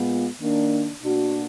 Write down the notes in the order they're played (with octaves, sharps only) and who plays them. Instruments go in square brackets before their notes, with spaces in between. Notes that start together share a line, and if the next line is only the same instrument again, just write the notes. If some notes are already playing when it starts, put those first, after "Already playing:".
Already playing: [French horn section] A#2 G#3 B3 F4
D#3 A#3 D4
B2 A#3 D4 F#4